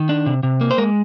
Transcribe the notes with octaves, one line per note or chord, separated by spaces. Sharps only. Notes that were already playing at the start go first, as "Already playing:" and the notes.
Already playing: D#3
D4
C3
C3
A#3
C5
G#3 A#4